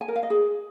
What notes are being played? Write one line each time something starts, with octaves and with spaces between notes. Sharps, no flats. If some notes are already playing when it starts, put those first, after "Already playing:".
G#5
A#4
F5
D#5
G#4